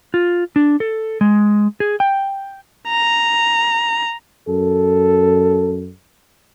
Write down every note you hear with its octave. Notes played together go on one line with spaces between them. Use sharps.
F4
D4
A4
G#3
G#4
G5
A#5
F#2 A4